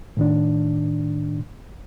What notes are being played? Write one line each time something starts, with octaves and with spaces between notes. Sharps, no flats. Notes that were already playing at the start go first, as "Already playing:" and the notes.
A2 D#3 D4